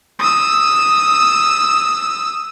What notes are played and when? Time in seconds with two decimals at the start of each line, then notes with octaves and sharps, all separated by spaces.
0.19 D#6 E6